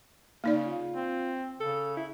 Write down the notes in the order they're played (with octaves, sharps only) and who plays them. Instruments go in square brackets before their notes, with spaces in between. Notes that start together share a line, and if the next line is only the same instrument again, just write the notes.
[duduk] C#3 [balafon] A#3 D#4 D5
[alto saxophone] F4
[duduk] C4
[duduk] C#3 [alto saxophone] A4
[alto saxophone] E4